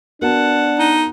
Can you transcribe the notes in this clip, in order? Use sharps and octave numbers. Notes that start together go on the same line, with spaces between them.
B3 D4 F#4 A#4 F#5 A5
D#4